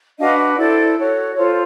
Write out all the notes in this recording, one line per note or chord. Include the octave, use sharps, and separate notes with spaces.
D4 F#4 B4 D#5 F5
E4 A4 C5 D5
F#4 A4 C#5
F4 A4 C5 C#5